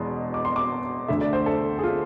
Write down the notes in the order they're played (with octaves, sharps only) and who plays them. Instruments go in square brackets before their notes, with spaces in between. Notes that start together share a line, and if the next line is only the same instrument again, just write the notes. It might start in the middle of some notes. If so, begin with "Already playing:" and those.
Already playing: [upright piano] E1 E2 B2 G#3 C6
D6
C6
D6
D2 D3 A3 E5
D5
C5
A4
G#4
F4